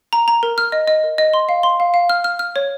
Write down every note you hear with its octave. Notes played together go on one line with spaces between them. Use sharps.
A#5
A#5
A#4
F6
D#5
D#5
A#4
D#5
C6
F5
C6
F5
F5
F6
F6
F6
C#5